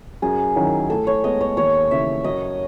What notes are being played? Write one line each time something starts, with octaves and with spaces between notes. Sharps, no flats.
F#2 G#4
D#3 F#3 C#4 E4
A2 A4
C#5
G#3 B3 D#5
C#5
D#2 C#5
C#3 E3 E5
F#2 D#5